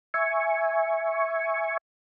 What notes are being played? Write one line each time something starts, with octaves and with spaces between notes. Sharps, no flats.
E5 G#5 C#6